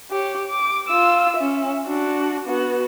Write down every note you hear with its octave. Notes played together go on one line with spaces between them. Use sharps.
G4 C#5
D6
F4 E6
C#4 E5
D4 F#4
B3 F#4